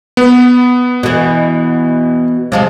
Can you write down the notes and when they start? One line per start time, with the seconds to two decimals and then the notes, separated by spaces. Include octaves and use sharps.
0.17 B3
1.03 B2 E3
2.52 C3 F3 G#3